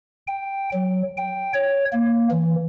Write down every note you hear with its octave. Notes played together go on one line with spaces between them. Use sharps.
G5
F#3
G5
C#5
A#3
E3